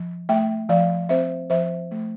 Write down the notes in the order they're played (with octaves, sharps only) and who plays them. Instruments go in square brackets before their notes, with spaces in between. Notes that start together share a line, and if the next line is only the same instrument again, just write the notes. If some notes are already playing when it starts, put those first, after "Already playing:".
Already playing: [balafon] F3
A3 E5 G5
F3 D5 F5
C4 C5 E5
F3 C5 E5
A3